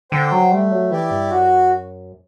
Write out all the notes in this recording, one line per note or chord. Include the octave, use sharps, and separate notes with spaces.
D3 C5 G5
F#3
G3 A3
F#3
E3 E4 G4 D5
G2
F#2 F#4